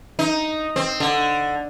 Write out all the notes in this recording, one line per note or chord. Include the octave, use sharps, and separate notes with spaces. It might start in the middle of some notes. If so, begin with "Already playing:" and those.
D#4
C4
D3